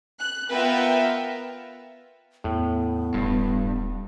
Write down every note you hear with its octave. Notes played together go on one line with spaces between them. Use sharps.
F#6
B3 F4 A#4 B4 E5 G5
E2 A2 B3
D#1 G2